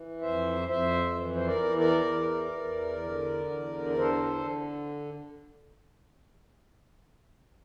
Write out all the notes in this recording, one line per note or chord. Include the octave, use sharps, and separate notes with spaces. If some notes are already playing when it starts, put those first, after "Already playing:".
Already playing: E3
F2 C5 E5
F2 C5 E5
E3
C5
A#4 D5
E2
A#4 D5
E3
E2
D3
E2
D5
D3 A4 C5